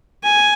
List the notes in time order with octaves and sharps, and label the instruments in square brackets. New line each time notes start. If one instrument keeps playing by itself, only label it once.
[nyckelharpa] G#5